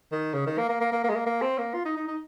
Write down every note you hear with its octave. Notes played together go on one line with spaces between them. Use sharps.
D#3
C#3
D#3
A#3
A#3
A#3
A#3
A#3
G#3
A#3
A#3
C4
A#3
F4
D#4
D#4
D#4